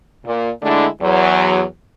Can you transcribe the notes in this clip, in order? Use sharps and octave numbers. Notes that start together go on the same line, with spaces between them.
A#2
D3 G#3 A3 D4 E4
E2 F#3